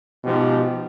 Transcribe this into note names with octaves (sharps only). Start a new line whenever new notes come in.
G#2 B2 F3 G4